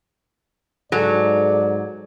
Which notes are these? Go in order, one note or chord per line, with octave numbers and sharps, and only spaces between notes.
G#2 F#3 G#4 A4 D5